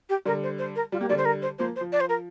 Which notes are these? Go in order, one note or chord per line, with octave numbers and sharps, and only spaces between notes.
G4
D3 G3 A#4
C5
C5
A#4
G3 F4
A#3 G4
D3 G3 D5
C5
A#4
C5
F3 A#3 C5
C5
F3
D5
C5
A#4